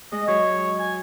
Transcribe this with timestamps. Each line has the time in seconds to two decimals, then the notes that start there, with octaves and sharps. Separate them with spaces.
0.12 G#3 D#5
0.28 F#3 C#5
0.79 G#5